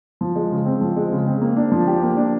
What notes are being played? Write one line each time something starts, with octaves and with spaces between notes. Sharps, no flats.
F3
G#3
C#3
C4
F3
G#3
C#3
C4
A#3
D4
F3
G4
A#3
D4